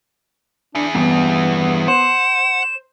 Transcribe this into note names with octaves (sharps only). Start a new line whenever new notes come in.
D4 E4 G#4
E2 G2 B3
C5 F#5 E7